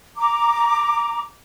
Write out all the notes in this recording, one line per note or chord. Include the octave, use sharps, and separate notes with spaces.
A#5 D6